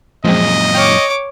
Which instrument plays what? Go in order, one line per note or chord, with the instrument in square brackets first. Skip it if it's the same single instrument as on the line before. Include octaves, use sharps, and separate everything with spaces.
[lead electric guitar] F#2 A#2 [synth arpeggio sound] F3 G#3 C4 [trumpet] D#5
[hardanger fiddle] C#5 D6 [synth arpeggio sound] G5 F6